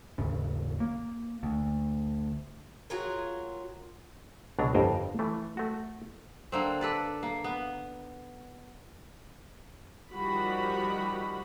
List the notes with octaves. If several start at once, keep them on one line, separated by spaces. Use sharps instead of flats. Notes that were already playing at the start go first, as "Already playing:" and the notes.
G#1 D#2 C#3
A#3
D2
F#3 F4 G#4 A#4
C#2 B2 F#3 D4 A#5
G1 F2 A#4 C5 G5 G#5
E3 A3
A3 F#4
D3 A#3 C4
A4 B4 D5
A#3
B3
D#3 F3 G3 F#4 B5